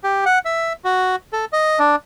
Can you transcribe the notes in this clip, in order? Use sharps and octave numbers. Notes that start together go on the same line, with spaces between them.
G4
F#5
E5
F#4
A4
D#5
D4